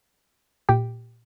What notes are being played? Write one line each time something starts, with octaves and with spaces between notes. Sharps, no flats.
A#2 G4 G5